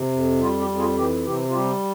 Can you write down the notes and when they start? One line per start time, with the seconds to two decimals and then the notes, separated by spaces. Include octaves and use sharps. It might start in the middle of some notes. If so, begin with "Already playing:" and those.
Already playing: C3
0.12 F2
0.40 G3 F4
0.59 G4
0.68 F2
0.78 F4 G#4
0.97 E3 G4
1.25 C3 G4
1.49 F4
1.54 G3 G4